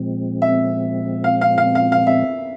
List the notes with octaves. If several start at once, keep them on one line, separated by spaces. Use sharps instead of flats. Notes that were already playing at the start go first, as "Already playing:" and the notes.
Already playing: A#2 F3 G#3 C4
E5
F5
F5
F5
F5
F5
E5